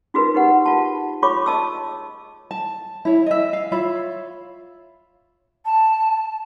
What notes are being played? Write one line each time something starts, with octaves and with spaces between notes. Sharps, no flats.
D#4 F4 F#4 G#4 A#4 B4
D#4 F#4 G4 B4 F#5
F4 A5
F4 G#4 C#5 B5 C#6 D6
D#5 A5 E6
A5
E4 C#5
D#5 E5
F5
F4 C#5 E5 B5
A5